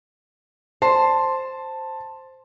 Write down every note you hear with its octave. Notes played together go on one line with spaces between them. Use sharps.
C5 A5